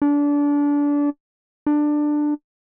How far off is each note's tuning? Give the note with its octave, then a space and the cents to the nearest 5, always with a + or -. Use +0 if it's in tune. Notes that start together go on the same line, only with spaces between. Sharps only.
D4 -25
D4 +15